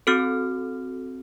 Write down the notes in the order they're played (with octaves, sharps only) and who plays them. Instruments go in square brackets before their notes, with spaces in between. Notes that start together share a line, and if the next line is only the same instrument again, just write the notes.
[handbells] C4 F#4 A4 F6